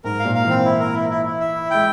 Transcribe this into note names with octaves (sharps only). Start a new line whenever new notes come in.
G#2 A#4
F5
A#2
F5
E3 C4
E4
A#4
E4
E4
E4
E5
E4
G#3 G5